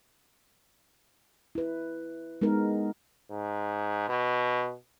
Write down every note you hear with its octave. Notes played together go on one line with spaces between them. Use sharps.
E4 B4
G#3 B3 D#4 A#4
G#2
B2